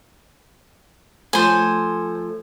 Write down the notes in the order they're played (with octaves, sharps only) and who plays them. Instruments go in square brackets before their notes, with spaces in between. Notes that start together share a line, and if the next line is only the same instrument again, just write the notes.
[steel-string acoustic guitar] F3 A3 [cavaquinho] C5 G#5